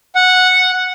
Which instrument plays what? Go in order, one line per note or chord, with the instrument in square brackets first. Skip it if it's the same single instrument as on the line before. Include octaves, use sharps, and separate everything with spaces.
[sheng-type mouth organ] F#5